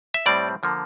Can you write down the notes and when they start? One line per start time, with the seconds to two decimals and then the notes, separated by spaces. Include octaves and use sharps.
0.14 E5
0.26 A2 G3 C4 D5
0.63 D3 F3 A#3